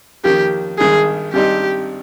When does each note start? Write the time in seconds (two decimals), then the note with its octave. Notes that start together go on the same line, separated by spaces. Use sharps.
0.25 F2 D#3 A#3 C#4 G4
0.79 G#1 G2 D#3 G#3 G#4
1.34 G#1 G2 G3 C4 D#4 G4